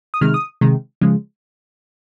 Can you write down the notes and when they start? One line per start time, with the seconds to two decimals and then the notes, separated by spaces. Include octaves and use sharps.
0.14 D#6
0.21 C3 D#3 G#3 F6
0.34 D#6
0.61 C3 D#3 G#3
1.01 C#3 F3 G#3